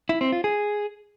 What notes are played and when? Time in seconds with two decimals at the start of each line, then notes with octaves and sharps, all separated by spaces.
0.09 E4
0.21 C4
0.32 F4
0.44 G#4